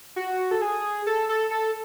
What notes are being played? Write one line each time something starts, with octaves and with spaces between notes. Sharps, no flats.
F#4
A4
G#4
A4
A4
A4